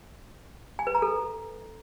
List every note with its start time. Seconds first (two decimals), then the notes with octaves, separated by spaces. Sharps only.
0.79 G#5
0.87 B4
0.95 A#5
1.02 A4